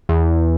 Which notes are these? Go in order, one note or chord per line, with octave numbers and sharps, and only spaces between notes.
E2